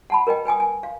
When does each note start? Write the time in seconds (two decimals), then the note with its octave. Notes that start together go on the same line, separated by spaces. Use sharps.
0.10 F#5 A5 B5
0.27 A#4 B4 D#5 G5
0.45 B4 G5 G#5 D#6
0.60 G#5
0.83 F5